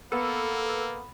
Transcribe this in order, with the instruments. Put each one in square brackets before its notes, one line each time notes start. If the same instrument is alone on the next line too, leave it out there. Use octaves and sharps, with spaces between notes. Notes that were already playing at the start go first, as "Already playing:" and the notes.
[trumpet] A#3 [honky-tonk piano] B3 [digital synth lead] A4 [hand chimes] B5